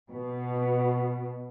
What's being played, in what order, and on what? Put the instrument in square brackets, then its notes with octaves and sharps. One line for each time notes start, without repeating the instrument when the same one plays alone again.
[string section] B2